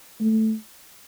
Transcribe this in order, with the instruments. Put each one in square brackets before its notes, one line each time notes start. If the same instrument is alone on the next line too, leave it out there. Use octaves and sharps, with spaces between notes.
[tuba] A3